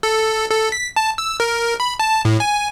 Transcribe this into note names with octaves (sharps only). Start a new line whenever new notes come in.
A4
A4
B6
A5
E6
A#4
B5
A5
A2
G#5